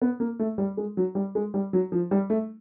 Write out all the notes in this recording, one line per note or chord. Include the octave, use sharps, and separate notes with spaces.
B3
A#3
A3
G3
G#3
F#3
G3
G#3
G3
F#3
F3
G3
A3